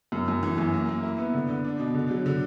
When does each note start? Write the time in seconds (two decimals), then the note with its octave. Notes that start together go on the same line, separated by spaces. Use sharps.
0.12 F#2
0.28 F#2
0.43 E3
0.58 F#2
0.74 A#3
0.88 A#3
1.03 E4
1.18 B3
1.33 D3
1.49 D3
1.64 D4
1.80 B2
1.95 D3
2.11 F#3
2.26 D3